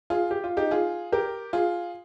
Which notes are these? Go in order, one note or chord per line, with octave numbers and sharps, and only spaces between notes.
F4 G#4
G4
F4
D#4 G4
F4 G#4
G4 A#4
F4 G#4